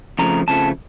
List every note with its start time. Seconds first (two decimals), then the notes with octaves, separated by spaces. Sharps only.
0.19 F2 C#3 F3 A3 A#5
0.47 F2 C#3 F3 A3 A5